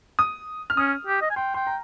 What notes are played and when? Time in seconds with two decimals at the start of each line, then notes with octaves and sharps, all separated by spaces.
0.19 D#6
0.70 F6
0.77 C#4 D#6
1.07 G4
1.22 D#5
1.30 G#5
1.36 G5 C6
1.54 G5 C6
1.67 A#5